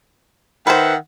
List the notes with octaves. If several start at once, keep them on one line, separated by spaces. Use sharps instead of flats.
D#3 B4 C5 E5 F#5